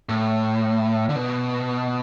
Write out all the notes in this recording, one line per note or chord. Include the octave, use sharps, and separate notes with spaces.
A2
D3
B2